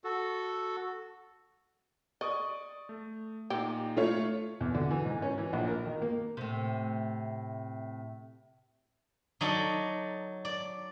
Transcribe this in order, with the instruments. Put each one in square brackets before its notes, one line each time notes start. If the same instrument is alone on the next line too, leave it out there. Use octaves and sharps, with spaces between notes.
[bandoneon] F#4 A4
[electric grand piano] D5 C#6 D#6 [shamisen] D#5
[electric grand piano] A3
[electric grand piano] A#2 D#4 [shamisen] G4
[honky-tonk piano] A3 F4 C#5
[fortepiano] E2
D3
E3
G#2
C#4
E3
A#1
A#4
D#3
A#3
[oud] A2 C3
[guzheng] F#3 D#4 A4 D5
D5